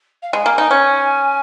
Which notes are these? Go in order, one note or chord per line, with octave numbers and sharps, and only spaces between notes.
F5
G#3 G#5
A#3
D#4
C#4